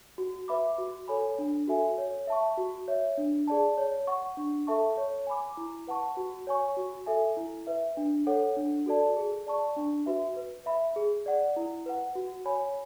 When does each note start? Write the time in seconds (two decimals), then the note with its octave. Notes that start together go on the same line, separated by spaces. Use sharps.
0.18 F#4
0.48 B4 E5 B5 D6
0.78 F#4
1.08 A4 C#5 G#5 B5
1.39 D4
1.68 F#4 A4 E5 G#5
1.98 C#5
2.27 E5 A5 C#6
2.57 F#4
2.88 C#5 E5
3.18 D4
3.48 G#4 D5 A5
3.78 C#5
4.07 F#5 C#6
4.37 D4
4.67 A4 E5 A5 C#6
4.97 C#5
5.27 G#5 B5 D6
5.57 E4
5.87 B4 F#5 A5 C#6
6.17 F#4
6.47 C#5 G#5 C#6
6.77 F#4
7.06 A4 E5 G#5
7.37 E4
7.67 B4 E5
7.97 D4
8.27 A4 C#5 F#5
8.57 D4
8.86 F#4 A4 D5 A5
9.17 G#4
9.47 D5 A5 C#6
9.76 D4
10.06 F#4 B4 E5
10.36 B4
10.66 E5 B5
10.96 G#4
11.26 D5 F#5
11.56 E4
11.86 B4 F#5
12.15 F#4
12.45 C#5 G#5 B5